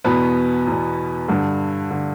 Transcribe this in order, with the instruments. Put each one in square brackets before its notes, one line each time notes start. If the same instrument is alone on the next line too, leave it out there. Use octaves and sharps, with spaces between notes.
[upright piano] E2 B2 B3 B4
E2 B2
G2 D3
D3